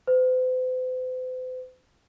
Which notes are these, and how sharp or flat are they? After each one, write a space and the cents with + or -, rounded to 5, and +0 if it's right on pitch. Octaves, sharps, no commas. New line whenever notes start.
C5 -45